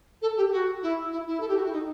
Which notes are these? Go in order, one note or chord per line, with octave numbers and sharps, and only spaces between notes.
A4
G4
F#4
E4
E4
E4
A4
G4
F#4
E4
D#4